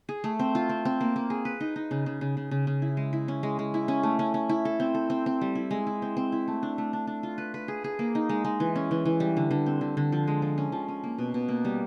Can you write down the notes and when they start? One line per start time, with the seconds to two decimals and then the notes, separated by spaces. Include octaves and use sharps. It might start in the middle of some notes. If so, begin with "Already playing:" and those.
0.09 G#4
0.24 A3
0.39 C4
0.55 F4
0.69 C4
0.85 C4
1.01 A#3
1.16 A#3
1.30 G#4
1.45 B4
1.61 D#4
1.76 D#4
1.91 C#3
2.06 C#3
2.21 C#3
2.37 C#3
2.51 C#3
2.67 C#3
2.82 E4
2.97 G#3
3.13 E4
3.28 C#4
3.43 G#3
3.59 G#3
3.74 E4
3.88 C#4
4.03 A3
4.19 C#4
4.34 C#4
4.49 E4
4.65 A4
4.80 C4
4.95 A4
5.10 C4
5.26 C4
5.41 G3
5.55 E4
5.71 G#3
5.87 E4
6.02 C4
6.17 C4
6.32 E4
6.48 A3
6.63 D4
6.78 A3
6.93 D4
7.07 D4
7.23 F4
7.38 B4
7.54 B4
7.68 G#4
7.84 G#4
7.99 A#3
8.15 D#4
8.29 G#3
8.45 G#3
8.60 E3
8.76 C#4
8.91 E3
9.06 E3
9.20 G3
9.37 D3
9.51 D3
9.66 C4
9.81 D3
9.97 D3
10.12 F3
10.27 G#3
10.42 F3
10.58 C#4
10.72 F3
10.88 C#4
11.04 A#3
11.18 B2
11.34 B2
11.49 A#3
11.65 G3